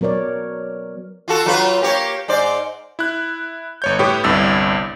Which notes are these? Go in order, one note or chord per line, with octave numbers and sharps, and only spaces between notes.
F#3 B3 A#4 C#5 D5
F4 F#4 A4
F#3 F4 B4
A#3 G4 C#5
G#2 C5 D5
E4 F#6
G1 C#5 G6
A2 G4 B4 C#5
G1 C2 G2 E4 E6 A6